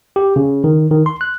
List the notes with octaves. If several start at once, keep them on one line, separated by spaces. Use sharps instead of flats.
G4
C#3
D#3
D#3
C6
F#6